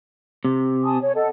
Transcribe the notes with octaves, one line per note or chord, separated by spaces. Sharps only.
C3
G#5 A5 D#6
C#5
A4 D#5 F#5